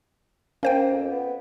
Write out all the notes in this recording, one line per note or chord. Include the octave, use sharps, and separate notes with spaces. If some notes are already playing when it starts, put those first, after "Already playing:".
A#3 C#4 C5 G5
F2
B3